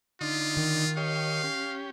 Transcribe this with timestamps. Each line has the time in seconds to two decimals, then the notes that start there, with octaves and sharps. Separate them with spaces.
0.21 D3 D#4 F4
0.57 D#3
0.97 G4 C#5 D#5 F5
1.43 C#4 G4